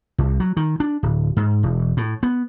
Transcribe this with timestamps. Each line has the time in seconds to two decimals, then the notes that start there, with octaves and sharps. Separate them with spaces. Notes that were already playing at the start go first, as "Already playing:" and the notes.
0.18 C2
0.40 F#3
0.57 D#3
0.80 D4
1.03 D1
1.37 G#2
1.63 E1
1.97 A2
2.23 B3